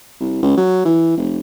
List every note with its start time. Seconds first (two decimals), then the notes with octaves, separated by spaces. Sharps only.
0.21 C2
0.42 C#2
0.57 F#3
0.85 E3
1.17 F1